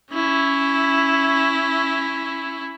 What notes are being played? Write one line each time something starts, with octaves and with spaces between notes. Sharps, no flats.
C#4 E4